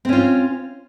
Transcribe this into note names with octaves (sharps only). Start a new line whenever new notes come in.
C4 C#4 F4